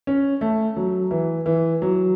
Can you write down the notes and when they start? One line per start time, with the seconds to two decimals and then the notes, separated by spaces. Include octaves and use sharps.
0.07 C#4
0.41 A3
0.77 F#3
1.11 E3
1.46 E3
1.82 F#3